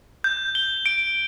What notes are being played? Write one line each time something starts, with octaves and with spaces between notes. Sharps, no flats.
G6
G7
D7